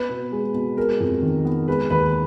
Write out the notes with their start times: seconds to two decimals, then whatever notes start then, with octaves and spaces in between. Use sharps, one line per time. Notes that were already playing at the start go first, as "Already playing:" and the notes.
Already playing: B3 B4
0.09 B2
0.32 G#3
0.55 B2
0.77 G#3 A#4
1.00 F2
1.22 D#3
1.45 B3
1.68 G#3 B4
1.90 D#2 B4